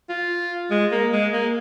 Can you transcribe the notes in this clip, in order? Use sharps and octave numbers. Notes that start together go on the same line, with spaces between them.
F4
G#3
A#3
G#3
A#3